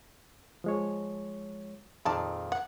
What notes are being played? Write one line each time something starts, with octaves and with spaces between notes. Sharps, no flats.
F3 G#3 C#5
F2 A#2 D#3 D#4 G#4 D5 A5
F#5